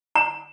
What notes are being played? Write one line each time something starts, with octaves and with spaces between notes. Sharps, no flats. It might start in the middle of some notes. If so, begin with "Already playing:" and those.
A#5